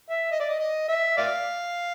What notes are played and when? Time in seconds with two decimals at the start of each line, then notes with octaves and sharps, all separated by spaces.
0.10 E5
0.31 D#5
0.40 D5
0.49 D#5
0.59 D#5
0.88 E5
1.17 D5 F5